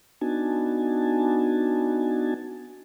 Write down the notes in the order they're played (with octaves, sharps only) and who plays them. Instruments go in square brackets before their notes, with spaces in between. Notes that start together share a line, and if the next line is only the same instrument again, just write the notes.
[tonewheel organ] B3 D4 D#4 F#4 G#5 A5